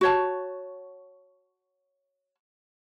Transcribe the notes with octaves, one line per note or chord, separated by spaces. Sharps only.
F#4 C#5 A5